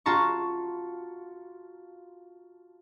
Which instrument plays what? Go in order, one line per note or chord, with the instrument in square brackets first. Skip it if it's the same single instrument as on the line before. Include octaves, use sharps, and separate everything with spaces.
[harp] F4 F#4 A5 A#5 C#6